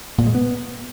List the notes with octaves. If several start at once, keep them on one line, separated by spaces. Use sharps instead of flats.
A#2
G#3
B3